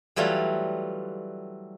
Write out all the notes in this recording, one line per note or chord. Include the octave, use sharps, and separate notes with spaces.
E3 F#3 G3 A3 F4